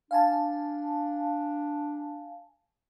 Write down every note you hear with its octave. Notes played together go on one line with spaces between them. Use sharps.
D4 F5 G#5 A5